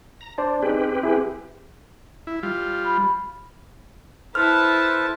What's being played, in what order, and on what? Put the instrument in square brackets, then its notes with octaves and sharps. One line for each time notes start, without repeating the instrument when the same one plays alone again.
[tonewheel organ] A#5
[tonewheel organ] D4 [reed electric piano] C5 D5 A5
[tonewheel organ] C4 G4 B4 [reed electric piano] D#4 G#4
[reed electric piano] E4 G#4
[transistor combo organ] E4
G3 F4
[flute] B5
[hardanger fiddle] E4 A5 [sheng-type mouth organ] A4 B4 C5 [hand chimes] F6